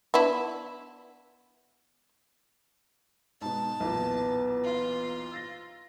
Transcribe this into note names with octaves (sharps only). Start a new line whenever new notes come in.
B3 D4 E4
G#2 B2 A5
B1 E2 A#2 B3
F4
E6 A6 A#6